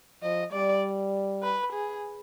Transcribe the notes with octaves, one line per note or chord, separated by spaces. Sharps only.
F3 D#5
G3 D5
B4
G#4